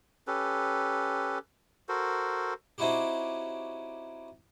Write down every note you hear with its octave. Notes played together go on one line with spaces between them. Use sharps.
C#4 G4 A4 B4
F#4 A4 A#4 C5
C4 C#4 D#4 E4 F#4 G4